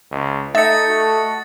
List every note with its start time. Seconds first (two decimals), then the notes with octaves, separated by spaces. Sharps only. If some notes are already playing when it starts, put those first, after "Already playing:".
0.11 C#2
0.55 A3 D#4 D#5 E5 A6 C#7
0.89 F#4 A4 D#5